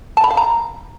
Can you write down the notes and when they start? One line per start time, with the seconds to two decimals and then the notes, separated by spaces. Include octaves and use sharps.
0.17 A5
0.24 B5
0.31 F5
0.37 A#5